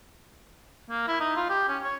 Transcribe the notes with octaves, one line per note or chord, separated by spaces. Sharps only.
A#3
E4
D#4
F4
G4
C#4
C#5